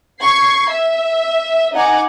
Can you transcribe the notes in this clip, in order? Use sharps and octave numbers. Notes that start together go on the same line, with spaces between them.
C#6 G#6 C7
E5
D#4 D#5 F#5 G#5 A#5 D6